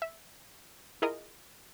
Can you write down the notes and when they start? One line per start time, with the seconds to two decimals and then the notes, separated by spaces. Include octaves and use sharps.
0.02 E5
1.02 E4 F4 G#4 A#4 D#5